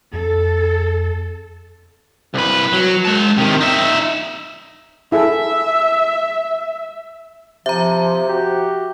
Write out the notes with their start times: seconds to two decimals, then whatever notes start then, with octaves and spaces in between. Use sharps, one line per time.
0.13 F2 A4
2.34 C2 B4
2.73 F#3
3.05 G#3 A5
3.38 C3 D#3
3.61 D#4 E5
5.12 E4 G#4 A4 E5
7.66 C3 F3 E5 A#5
8.29 F#4 G4